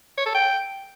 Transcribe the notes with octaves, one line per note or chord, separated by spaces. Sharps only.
C#5
A4
G5